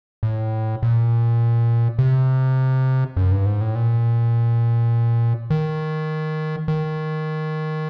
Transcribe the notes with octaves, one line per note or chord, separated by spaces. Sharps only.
A2
A#2
C3
F#2
G2
G#2
A2
A#2
D#3
D#3